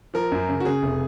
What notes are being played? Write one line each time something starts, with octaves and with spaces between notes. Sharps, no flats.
F3 A#4
F#2
C#3
F#4
C#3 G#4
F1